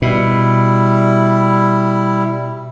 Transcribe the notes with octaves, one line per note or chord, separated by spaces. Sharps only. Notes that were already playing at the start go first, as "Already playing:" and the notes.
B2 G3 E4